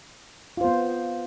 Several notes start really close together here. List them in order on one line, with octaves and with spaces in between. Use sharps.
F4 C5 B3